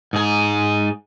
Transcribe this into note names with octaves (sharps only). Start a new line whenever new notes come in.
G#2 G#4